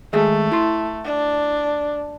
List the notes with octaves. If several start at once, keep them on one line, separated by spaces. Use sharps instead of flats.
D#3 G#3 A3 G#4
E4 C6
D4